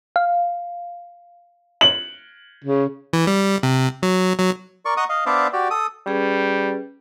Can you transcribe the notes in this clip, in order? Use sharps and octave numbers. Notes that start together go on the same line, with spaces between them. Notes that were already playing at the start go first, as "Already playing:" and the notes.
F5
F#7
C#3
E3
G3
C3
F#3
F#3
A#4 D5 C#6
D#5 F#5 A#5 C#6 D#6
D#5 F5
B3 D4 C5 D5 E5 F5
F#4 G4 D5
A4 D#6
G3 C#4 G#4 B4